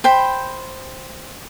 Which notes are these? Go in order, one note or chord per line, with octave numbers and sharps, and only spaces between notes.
C5 G5 B5